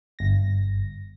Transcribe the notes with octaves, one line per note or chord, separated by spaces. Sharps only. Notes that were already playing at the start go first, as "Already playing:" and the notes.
G1 A#6